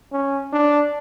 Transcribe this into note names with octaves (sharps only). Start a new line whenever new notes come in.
C#4
D4